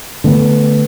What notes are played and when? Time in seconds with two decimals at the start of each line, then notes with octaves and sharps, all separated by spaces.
0.24 D3 A3 B3